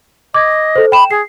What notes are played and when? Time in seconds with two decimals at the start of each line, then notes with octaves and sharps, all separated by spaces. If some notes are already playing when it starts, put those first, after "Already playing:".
0.34 D#5 D6 G#6
0.76 A4 C5
0.92 G5 B5 E7
1.11 G#4 C7